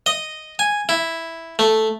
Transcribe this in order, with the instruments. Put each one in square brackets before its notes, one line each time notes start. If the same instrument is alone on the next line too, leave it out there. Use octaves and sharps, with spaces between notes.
[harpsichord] D#5
G#5
E4
A3